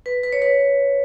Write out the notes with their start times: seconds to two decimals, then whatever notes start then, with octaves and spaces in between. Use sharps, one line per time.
0.06 B4
0.23 B4
0.33 C#5
0.42 B4